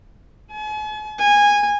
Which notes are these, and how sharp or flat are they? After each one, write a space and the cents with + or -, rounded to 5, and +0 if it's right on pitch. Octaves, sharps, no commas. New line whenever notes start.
G#5 +45
G#5 -15